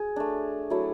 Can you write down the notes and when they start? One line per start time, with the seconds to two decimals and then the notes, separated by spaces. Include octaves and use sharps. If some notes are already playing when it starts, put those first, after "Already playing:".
Already playing: G#4
0.16 A3 D4
0.70 F#3 A3 E4